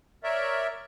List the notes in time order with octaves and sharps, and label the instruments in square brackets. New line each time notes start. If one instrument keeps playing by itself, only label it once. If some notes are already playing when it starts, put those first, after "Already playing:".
[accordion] A#4 C#5 D5 E5